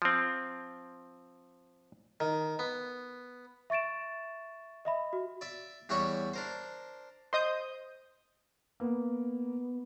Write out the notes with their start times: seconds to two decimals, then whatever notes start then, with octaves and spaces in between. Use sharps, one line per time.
0.02 F3 C4
2.20 D#3
2.59 B3
3.70 E5 C#6 A6 D7 E7
4.85 D#5 E5 B5
5.13 F#4
5.41 D5 E5
5.89 E2 G3 F#4 C#5 E5 B5
6.33 D4 A#4 C5
7.33 C5 D#5 D#6 G6
8.80 A#3 B3